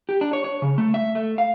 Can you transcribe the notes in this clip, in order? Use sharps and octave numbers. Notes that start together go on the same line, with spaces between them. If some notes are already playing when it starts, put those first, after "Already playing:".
G4
D4
C#5
C#5
C#3
A3
E5
A3
F5